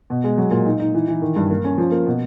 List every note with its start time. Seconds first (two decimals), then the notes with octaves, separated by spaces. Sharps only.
0.10 B2
0.24 G#3
0.38 F#3
0.51 A#2
0.66 D#4
0.80 D#4
0.94 E3
1.08 E3
1.22 D#3
1.36 G2
1.50 A#3
1.64 C#4
1.78 F3
1.92 A#3
2.07 B2